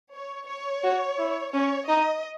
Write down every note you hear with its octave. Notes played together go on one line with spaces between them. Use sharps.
C#5
C#5
F#4
E4
C#4 C#5
D#4 D#5